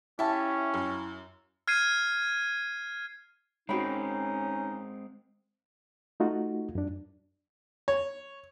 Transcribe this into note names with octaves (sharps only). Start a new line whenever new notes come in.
C#4 E4 G4 E5 F5 A5 B5
F#2
F6 G#6 C7 D#7
G#3 C4 C#4 D#4 F#4 G5 B5
A3 D#4 F4 F#4
F#2 D4
C#5